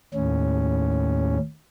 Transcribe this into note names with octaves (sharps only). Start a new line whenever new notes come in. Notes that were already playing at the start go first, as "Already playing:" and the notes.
D#2 A2 C#4